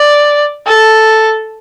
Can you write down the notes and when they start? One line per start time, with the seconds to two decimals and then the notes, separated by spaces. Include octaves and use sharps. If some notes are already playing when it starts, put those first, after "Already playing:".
Already playing: D5
0.67 A4